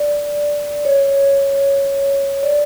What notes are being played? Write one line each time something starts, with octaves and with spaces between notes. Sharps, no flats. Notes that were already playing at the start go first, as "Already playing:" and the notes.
Already playing: D5
C#5
D5